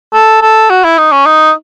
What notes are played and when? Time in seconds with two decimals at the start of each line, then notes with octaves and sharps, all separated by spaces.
0.13 A4
0.42 A4
0.70 F#4
0.84 E4
0.98 D#4
1.12 C#4
1.26 D#4